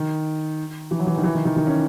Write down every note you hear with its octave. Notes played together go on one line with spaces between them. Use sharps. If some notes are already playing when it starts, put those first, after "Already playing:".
Already playing: D#3
E3
F#3
E3
D#3
E3
D#3
D#3
D#3
C#4